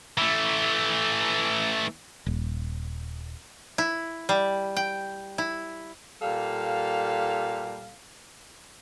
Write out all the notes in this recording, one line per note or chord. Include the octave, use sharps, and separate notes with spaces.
E3 A3
D#1
E4
G3
G5
E4
A#2 G3 A4 F5